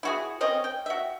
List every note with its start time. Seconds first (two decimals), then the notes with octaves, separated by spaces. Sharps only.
0.03 E4 F#4 G#4
0.41 C4 C#4 D#5
0.64 G5
0.86 F#4 E5